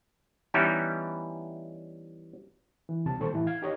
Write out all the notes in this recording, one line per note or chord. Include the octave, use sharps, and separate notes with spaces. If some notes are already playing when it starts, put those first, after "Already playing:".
E3 G3 B3 C#4 D#4 E4
E3
C2 C3 A5
A#2 D#3 G3 A4 C5 C#6
A2 E3 E4
F5 G#6
D#4 G4 A#4 C#5 D#5